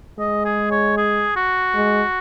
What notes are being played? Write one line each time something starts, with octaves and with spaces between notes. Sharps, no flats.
G#3 D#5
G#4
C#5
G#4
F#4
G#3